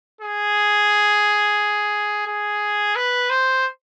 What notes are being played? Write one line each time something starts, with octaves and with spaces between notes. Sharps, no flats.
G#4
G#4
B4
C5